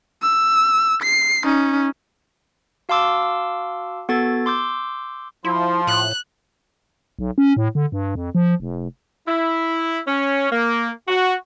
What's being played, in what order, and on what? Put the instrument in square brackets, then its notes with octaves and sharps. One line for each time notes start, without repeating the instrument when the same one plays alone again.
[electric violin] E6
C7
C#4 D#4
[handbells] F#4 F5 A5 C6 D6 E6
B3 F#4 A4 G#6 A6
C6 D6 E6 G6
[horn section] F3 [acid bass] E4 [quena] C6
[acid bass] A2 [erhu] F#6
[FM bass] B1
C#4
A2
D3
G2
F2
F3
F1
[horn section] E4
C#4
A#3
F#4